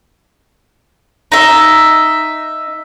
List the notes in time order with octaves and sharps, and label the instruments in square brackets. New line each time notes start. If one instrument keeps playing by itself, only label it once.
[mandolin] D#4 E5